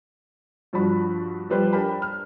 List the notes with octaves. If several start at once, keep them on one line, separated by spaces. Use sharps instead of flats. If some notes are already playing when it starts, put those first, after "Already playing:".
G2 F3 D4 F#4 B5
F3 G3 B4 C5 D5
D4 G4 A#4 G5 B5
F6